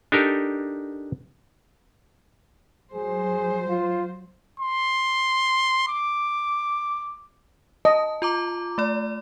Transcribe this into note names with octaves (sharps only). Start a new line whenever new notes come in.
D4 D#4 G4 A4 A#4
F#3 G#4 C5
F4
C6
D6
D#5 A5
F4 A#5 D6
A3 D5